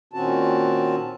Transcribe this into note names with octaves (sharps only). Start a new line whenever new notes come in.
A#2 D#3 C4 C#4 F#4 A5